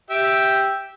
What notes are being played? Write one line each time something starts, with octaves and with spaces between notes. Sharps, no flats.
G4 E5 G5